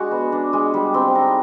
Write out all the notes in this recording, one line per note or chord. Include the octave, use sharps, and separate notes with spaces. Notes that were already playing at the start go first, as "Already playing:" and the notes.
Already playing: G#3 D4 F#4
B3
D4
G#3
G3
C4
D#4